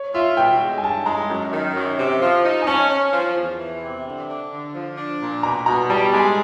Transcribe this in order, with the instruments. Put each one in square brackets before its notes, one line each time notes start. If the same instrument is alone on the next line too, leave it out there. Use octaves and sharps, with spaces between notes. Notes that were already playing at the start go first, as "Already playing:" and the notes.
Already playing: [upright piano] C#5
[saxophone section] F4 [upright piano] E5
[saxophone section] B2 [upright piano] G5
[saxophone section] G#3
[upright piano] G#5
[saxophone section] G2 [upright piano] A5
[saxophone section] G#3 [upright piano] A#5
[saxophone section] F#2
D#3
F#2
C3
F3
D#4
[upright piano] G#5
[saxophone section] C#4 [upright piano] A5
[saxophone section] C#4
F3
E2
E3
C3
D3
D4
D3
F3
D4
A#2
[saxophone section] B2 [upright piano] A#5
[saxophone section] B2 [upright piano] A#5
[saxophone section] G3 [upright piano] A5
[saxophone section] G#3 [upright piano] G#5